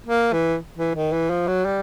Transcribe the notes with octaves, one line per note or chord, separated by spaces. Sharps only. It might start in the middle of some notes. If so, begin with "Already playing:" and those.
A#3
E3
E3
D#3
E3
F3
F#3
G3